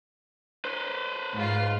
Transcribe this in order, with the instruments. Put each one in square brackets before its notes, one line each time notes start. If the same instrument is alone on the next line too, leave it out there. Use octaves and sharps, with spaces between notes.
[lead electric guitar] B4 C5
[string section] G#2 F4